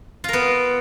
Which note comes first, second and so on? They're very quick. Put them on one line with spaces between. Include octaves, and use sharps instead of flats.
F4 A#4 B3